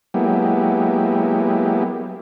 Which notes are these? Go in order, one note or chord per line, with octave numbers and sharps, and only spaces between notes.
F#3 G#3 A#3 B3 E4 G4